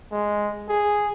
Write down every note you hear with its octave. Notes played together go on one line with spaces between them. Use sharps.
G#3
G#4